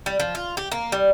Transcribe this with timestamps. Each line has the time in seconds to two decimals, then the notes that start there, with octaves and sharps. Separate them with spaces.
0.06 G3
0.20 F3
0.35 F4
0.57 G4
0.72 A#3
0.92 G3